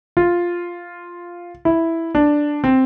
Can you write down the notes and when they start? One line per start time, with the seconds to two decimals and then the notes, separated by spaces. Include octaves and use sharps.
0.17 F4
1.65 E4
2.15 D4
2.64 C4